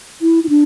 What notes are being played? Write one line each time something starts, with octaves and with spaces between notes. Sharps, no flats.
E4
E4
D4